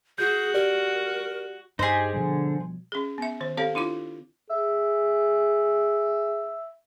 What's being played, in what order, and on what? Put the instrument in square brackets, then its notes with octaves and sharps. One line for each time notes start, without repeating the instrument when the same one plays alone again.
[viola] F#4 [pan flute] G#4 [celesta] G6
[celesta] G4 D5 [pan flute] A#4
[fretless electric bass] G2 [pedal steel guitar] D#4 G4 [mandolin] G#4 C5
[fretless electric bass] B2 F3 G3 [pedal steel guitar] D3
[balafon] C#4 G#4
B3 E5
D#3 C5
C4 G4 A4 C#5 F5
D4 E4 F4 D6
[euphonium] G#4 [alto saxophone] E5